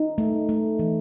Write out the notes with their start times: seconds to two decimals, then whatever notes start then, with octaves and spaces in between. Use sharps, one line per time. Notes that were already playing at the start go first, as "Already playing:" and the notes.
Already playing: D#4
0.18 A3
0.49 A3
0.79 E3